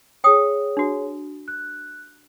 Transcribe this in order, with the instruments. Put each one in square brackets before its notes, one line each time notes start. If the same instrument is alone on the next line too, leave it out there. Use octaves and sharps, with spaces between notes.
[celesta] G#4 C#5 [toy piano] G5 D#6
[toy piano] D4 F#4
[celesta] F#6